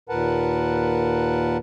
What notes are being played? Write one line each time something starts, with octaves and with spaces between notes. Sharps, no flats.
D#2 A#2 A#4 B4 F#5 A5